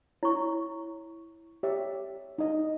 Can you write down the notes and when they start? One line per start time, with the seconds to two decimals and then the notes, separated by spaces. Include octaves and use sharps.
0.23 E4 C#5 C#6
1.63 G4 C#5 E5
2.38 D#4 D#5